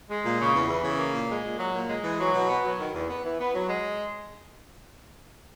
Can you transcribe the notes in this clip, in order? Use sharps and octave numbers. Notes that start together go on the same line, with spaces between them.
G#3
A#2
C#3
E2
E3
C#3
A#3
A#2
G#3
A#2
F#3
A#2
G#3
E3
F#3
B2
B3
F#3
D#3
E2
B3
E3
B3
F#3
G#3